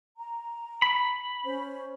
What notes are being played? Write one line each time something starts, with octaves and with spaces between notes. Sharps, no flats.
A#5
B5
C#4 C5